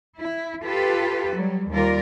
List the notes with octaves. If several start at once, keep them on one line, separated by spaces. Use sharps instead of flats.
E4
F4 G4 A4 B4
F#3 G3
D#2 G3 F4 A#4 D5